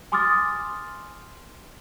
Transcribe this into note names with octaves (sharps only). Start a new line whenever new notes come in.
G#5 C6 D6 D#6 F6 A6